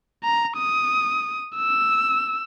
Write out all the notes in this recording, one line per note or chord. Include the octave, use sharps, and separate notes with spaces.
A#5
D#6
E6